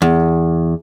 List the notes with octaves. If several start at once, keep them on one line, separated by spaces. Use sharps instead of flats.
E2